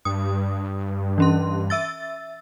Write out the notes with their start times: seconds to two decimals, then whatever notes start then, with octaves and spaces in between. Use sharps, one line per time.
0.05 G2 D#6
1.18 E3 C#4 C6
1.70 E5 E6 A6